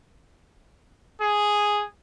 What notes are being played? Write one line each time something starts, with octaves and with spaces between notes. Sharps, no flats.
G#4